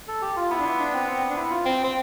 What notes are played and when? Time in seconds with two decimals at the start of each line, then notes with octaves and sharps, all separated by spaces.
0.08 A4
0.22 G4
0.36 F4
0.50 B3 E4
0.59 D4
0.64 E4
0.79 D4
0.93 C4
1.08 C4
1.30 D4
1.36 E4
1.50 F4
1.66 C4
1.84 C4